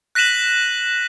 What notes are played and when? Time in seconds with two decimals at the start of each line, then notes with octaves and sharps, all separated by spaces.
0.15 F#6 A#6 B6 D#7 E7 F#7